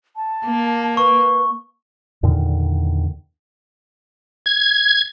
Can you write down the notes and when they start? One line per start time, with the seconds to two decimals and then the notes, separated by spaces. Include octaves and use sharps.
0.16 A5
0.45 A#3
0.97 B4 C#6
2.23 E2 A#2 D3 D#3
4.46 G#6